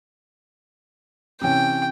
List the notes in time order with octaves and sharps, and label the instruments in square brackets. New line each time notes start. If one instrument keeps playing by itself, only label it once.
[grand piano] C3 E3 C#4 [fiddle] G5